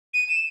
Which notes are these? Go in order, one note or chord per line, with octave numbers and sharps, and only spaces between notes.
D#7
E7